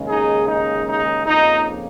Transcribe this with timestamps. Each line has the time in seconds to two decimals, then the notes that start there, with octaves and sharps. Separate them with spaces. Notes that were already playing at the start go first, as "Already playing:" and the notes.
Already playing: D#2 C#3 G#3
0.08 D#4 G#4
0.48 D#4
0.88 D#4
1.27 F2 C#3 F3 A#3 D#4